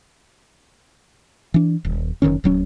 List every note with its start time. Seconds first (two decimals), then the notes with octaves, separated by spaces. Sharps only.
1.54 E3 D4
1.85 D#1
2.22 F#1 B1 D#3 C#4
2.44 D1 F#3 C#4